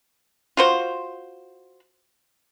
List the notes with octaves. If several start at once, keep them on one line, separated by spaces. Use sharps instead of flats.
F4 F#4 C5